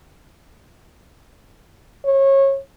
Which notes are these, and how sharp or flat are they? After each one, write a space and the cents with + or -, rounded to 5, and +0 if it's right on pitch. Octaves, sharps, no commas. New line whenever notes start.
C#5 -25